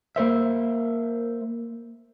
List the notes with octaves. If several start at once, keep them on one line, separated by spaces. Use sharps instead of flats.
A#3 A#4 C5 E5